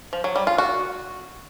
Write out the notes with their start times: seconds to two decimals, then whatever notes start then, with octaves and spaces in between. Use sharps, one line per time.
0.13 F3
0.24 F#3
0.36 G3
0.47 F4
0.58 F#4